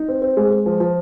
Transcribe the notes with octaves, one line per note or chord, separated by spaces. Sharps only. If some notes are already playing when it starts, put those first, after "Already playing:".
Already playing: D#4
C4
C4
G#3
G#3
F3
F3